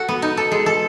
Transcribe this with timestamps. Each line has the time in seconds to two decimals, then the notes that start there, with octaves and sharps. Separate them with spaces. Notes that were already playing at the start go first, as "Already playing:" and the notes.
Already playing: F#4 A4
0.09 B3
0.22 D#4
0.37 A4
0.52 G#3
0.66 A4